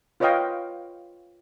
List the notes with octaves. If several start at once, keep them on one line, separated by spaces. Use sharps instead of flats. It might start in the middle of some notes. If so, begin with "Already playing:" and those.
F4 B4 C#5 D#5 F5 G5